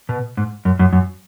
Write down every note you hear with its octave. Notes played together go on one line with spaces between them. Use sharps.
B2
G#2
F#2
F#2
F#2